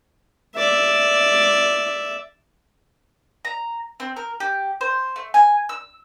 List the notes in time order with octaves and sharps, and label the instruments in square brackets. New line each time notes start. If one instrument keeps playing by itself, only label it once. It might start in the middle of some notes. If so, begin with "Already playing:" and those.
[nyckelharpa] D5 E5
[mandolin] A#5
C4
A#4
G4
C5
A3
G#5
E6